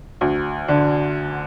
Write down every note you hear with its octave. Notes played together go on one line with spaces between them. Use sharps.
D2
D3